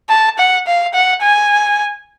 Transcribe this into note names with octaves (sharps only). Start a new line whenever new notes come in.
A5
F#5
F5
F#5
G#5